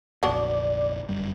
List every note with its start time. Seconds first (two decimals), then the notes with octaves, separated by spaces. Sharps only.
0.23 F1 A#1 F#3 B3 D4 D5
1.09 G1 F#2 G3